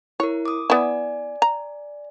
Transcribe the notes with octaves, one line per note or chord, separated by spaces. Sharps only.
E4 A#4 C#5
D6 D#6
B3 E4 D5 G#5
A#5